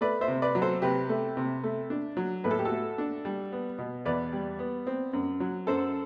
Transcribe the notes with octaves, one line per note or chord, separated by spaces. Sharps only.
A3 B4 D5
C5 E5
C3
B4 D5
F#3
A4 C5
C3 G4 B4
A3
C3
A3
D4
F#3
A2 B4
A4
G4
F#4 A4
A3
D4
G3
B3
B2
E2 B4 D5
G3
B3
C4
F#2
F#3
F#2 A4 C5